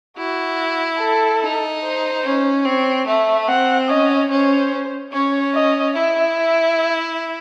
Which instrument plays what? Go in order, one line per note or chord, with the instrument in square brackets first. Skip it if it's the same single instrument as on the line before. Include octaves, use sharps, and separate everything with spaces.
[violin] E4 [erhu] F#4
[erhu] A4
[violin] D#4
[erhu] C5
[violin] C#4
[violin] C4 [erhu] C#5
[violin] A3 [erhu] E5
[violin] C4 [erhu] F#5
[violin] C#4 [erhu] D#5
[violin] C#4 [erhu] C5
[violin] C#4 [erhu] C#5
[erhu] D#5
[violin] E4 [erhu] E5
[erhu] E5